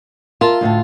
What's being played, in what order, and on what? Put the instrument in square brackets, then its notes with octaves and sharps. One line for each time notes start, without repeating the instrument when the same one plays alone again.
[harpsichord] F4 [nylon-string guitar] A#4 E5 A5
[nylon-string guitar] D2 A2 A5